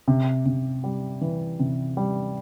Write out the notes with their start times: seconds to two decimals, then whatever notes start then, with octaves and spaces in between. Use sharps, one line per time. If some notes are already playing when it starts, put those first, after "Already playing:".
0.08 C3
0.46 C3
0.84 G3
1.21 E3
1.59 C3
1.97 G3